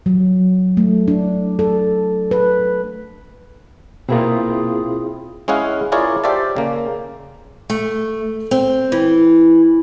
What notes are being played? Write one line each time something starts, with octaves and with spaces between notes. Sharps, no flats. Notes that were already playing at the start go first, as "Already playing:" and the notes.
F#3
A3
D4
A4
B4
B2 A#3 C4 E4 F4 G#4
G#3 C#4 E4 G#4 F5 F#5
E4 F4 G#4 A#4 C#5 D5
G4 C5 D5 E5 F5 A5
C#3 A#3
A3
C4
E3